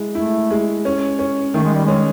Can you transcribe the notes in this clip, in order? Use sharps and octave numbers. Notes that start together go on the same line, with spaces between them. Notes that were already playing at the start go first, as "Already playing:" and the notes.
Already playing: G#3 E4
A3 E4
G#3
C#4
C#4
D#3 A3
G#3
G3
G#3 C#4